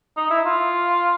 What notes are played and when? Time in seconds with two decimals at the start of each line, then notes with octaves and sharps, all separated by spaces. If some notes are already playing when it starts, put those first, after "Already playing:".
0.17 D#4
0.30 E4
0.45 F4